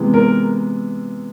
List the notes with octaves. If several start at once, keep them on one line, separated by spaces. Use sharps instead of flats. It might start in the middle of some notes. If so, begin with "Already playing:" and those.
Already playing: C3 E3 G#3 B3
A#4